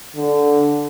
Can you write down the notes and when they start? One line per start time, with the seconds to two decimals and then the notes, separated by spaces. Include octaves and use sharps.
0.16 D3